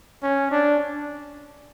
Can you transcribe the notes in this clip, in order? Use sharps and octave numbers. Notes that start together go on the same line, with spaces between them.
C#4
D4